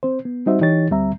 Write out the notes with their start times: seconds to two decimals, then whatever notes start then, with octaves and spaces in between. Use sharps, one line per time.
0.03 C4 C5
0.25 B3
0.46 G3 C4 D#4 F#4 C5 E5
0.61 E3 D#4 G4 C#5 A6
0.91 D2 G3 C4 E5 A#5